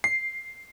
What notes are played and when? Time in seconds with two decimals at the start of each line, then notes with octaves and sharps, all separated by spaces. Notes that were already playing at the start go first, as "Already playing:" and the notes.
0.04 C7